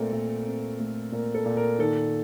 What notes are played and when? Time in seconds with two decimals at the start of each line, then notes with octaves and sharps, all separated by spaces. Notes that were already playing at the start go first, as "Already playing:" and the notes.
Already playing: A#2 A3 C4 A4 A#4
0.13 A#2
0.47 C4
0.80 A3
1.12 A#2 A#4
1.34 A4
1.46 A#2
1.57 A#4
1.79 D#3 A4